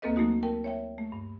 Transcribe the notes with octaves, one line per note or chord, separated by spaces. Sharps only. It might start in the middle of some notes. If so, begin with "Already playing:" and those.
D2 A#3 C4 A4 B4 D#5
F#3 A3 A#3 D#4 F#4
A#4 G5 A5
C#5 E5 G5
A3
G2